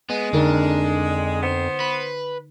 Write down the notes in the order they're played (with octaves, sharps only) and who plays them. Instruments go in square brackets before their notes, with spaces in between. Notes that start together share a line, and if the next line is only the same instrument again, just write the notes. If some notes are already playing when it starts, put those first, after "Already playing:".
[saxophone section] G#3 [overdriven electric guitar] B3
[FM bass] F2 [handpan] D3 D#4 A#4 [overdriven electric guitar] D4
[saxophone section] B3 C5
[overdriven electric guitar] B4